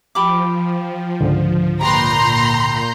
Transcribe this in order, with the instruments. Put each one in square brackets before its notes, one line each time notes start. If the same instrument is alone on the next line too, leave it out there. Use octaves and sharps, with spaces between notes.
[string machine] F3 [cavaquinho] G4 B5 D6
[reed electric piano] C#2 G#2 D3
[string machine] A#2 G6 [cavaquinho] G4 B4 [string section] A#5 C6